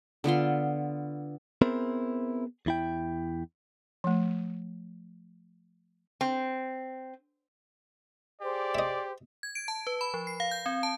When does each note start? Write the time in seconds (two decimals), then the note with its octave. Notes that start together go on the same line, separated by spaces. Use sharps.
0.24 D3 B3 F4 C6
1.62 B3 C4 E4 G#4 A#4 C5
2.66 E2 E4 G5
4.04 F3 A3
6.21 C4
8.41 G4 G#4 C5 D5
8.75 D#5 E5
9.43 G#6
9.55 D7
9.68 A5
9.87 B4
10.01 B5
10.14 F3
10.27 C7
10.40 F5
10.51 G6
10.66 C4
10.83 A5